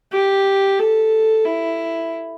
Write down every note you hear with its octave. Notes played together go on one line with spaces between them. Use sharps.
G4
A4
E4